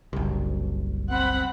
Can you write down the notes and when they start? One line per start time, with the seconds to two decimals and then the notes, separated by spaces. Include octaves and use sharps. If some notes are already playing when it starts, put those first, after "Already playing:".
0.13 F#1 C2
1.10 C4 F#5 B5